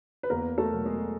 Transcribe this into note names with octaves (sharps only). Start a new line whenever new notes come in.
B4
E2 A#3 A#4
A3 A4
B2 F#3
G#3 G#4